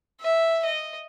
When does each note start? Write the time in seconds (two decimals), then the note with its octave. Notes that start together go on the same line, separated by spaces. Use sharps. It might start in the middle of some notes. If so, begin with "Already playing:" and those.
0.21 E5
0.65 D#5